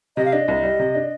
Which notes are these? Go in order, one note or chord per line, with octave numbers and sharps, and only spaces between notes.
C3 D#5
F5
D4 D#5
C2
G3
C3
D4